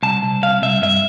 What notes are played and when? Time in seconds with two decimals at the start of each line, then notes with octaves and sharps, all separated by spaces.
0.03 C2 A5
0.23 C2
0.43 C2 F5
0.62 C2 E5
0.82 G2 E5